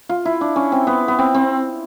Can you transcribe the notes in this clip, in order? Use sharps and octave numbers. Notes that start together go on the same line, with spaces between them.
F4
E4
D4
C#4
C4
B3
B3
C4
C4